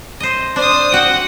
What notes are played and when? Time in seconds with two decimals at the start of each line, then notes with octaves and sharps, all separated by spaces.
0.20 C5 D#5
0.56 D4 C5 D#6
0.92 F#4 F#5 G5